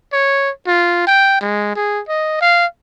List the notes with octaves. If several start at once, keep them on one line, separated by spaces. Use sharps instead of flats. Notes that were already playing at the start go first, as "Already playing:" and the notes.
C#5
F4
G5
G#3
G#4
D#5
F5